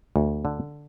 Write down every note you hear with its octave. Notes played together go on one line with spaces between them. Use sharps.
D2
D3